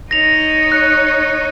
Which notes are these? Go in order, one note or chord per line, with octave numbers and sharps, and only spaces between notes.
D#4 C#5 A#6 F7
F#6